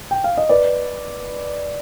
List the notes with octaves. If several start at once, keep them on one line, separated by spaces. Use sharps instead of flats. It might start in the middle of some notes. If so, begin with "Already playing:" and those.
G5
F5
D#5
B4 D5